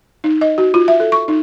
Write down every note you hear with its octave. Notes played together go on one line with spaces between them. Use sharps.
D#4
D#5
F#4
F4
E5
A4
C#6
D#4